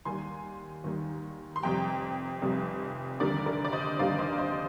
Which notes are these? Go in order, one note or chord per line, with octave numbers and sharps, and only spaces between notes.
D#2 D#3 G3 G#5 C6
D#2 D#3 G3
C6
F1 F2 C3 G3 G5 A#5
F1 F2 C3 G3
F1 D#2 D3 G3 A#4 D5
A#4 D5
D5
C5 D#5
F1 D#2 D3 G3 D5 F5
C5 D#5
C5 D#5